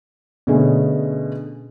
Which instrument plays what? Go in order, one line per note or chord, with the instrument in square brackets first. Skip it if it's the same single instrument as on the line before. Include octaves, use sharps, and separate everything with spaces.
[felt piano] B2 D3 A3 C#4 G#4